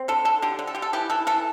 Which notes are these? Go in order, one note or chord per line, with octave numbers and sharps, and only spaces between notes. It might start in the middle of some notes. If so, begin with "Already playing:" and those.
Already playing: C4
D3 A4
D3 A4
D3 G4
D3
A4
D3 G4
A4
E3 G4
E3 A4
E3 A4